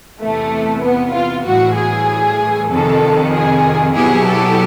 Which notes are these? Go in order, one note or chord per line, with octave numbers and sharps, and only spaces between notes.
E2 C3 E3 A3
B3
F4
A2 E3 G3 F#4
G#4
F2 C3 D#3 A4
G#4
B2 F#3 B3 E4 G4 G#4
A4